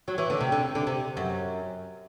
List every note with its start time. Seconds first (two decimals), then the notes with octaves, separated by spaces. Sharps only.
0.08 F#3
0.18 E3
0.30 D3
0.41 C3
0.52 D3
0.75 D3
0.87 C3
1.17 F#2